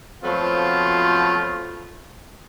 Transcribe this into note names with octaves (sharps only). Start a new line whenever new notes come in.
B2 F3 F#3 A3 C4 F4